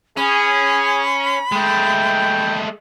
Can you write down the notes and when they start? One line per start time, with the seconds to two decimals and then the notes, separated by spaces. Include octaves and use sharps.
0.17 C#4 G#4 B5
1.52 G#3 A3 G5